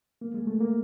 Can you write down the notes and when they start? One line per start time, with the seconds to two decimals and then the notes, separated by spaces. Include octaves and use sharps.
0.21 A#3
0.34 G#3
0.47 A3
0.60 A#3